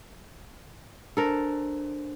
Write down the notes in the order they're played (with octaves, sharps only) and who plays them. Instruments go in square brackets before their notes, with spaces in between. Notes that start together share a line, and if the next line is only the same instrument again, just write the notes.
[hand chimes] D4 C5 [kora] A4 A#4